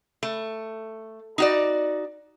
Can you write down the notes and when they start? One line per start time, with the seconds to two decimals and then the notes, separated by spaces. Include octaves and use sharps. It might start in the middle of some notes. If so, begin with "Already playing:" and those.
0.23 A3
1.38 D#4 F#4 D5